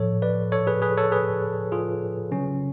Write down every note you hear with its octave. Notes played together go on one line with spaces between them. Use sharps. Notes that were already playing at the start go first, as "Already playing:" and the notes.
Already playing: A2 F3 A4 C#5
B4 D5
A4 C#5
G#4 B4
G#4 B4
A4 C#5
G#4 B4
F4 G#4
C#3 F#3 C#4